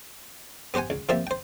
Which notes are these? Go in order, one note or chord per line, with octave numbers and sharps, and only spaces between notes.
B3 G4 C5 F#5 G#5
C#2
F3 A#3 C4 G4 D5 E5
C5 G5